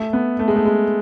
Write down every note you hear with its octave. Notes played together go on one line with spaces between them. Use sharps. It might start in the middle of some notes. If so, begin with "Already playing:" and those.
Already playing: A3
B3
A3
G#3
A3
G#3